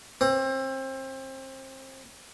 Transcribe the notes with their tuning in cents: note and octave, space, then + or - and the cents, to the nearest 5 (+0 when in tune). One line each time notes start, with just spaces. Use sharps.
C4 +30